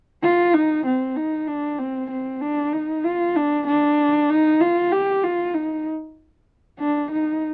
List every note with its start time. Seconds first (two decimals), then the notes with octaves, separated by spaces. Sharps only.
0.23 F4
0.54 D#4
0.86 C4
1.16 D#4
1.47 D4
1.78 C4
2.11 C4
2.41 D4
2.73 D#4
3.04 F4
3.36 D4
3.67 D4
4.30 D#4
4.60 F4
4.91 G4
5.23 F4
5.54 D#4
6.79 D4
7.11 D#4